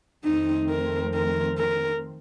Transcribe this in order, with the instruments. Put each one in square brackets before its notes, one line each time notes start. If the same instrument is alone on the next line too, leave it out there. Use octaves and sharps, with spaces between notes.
[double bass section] F2 D#3 A3 C4 [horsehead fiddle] D#4
[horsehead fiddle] A#4
A#4
A#4